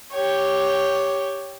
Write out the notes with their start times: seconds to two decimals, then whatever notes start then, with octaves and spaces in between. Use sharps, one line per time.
0.13 G4 C#5